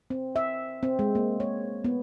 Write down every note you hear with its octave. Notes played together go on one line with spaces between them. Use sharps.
C4
E5
C4
G#3
A#3
C#5
B3